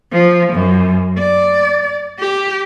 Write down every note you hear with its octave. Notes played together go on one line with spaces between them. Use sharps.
F3
F#2
D5
G4